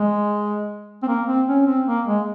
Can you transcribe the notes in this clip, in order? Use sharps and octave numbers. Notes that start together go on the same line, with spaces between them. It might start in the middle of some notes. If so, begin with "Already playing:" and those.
Already playing: G#3
C4
A#3
C4
C#4
C4
A#3
G#3